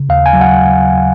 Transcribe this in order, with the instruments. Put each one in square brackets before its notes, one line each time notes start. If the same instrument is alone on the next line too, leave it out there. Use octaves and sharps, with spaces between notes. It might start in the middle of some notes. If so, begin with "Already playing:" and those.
Already playing: [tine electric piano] C#3
D#2 F5
G#5
F#3
F#5